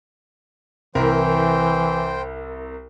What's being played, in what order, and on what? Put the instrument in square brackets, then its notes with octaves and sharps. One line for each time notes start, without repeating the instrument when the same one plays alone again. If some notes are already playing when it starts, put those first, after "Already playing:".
[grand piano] C2 E4 A#4 [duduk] E3 [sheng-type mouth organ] C5 G5